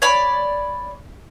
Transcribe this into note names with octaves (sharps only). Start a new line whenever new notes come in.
C#5 D5 B5